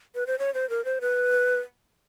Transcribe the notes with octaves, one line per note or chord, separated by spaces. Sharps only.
B4
C5
C#5
C5
A#4
C5
B4